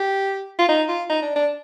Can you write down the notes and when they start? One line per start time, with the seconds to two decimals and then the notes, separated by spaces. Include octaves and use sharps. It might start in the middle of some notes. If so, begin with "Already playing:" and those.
Already playing: G4
0.59 F4
0.69 D#4
0.88 F4
1.10 D#4
1.22 D4
1.36 D4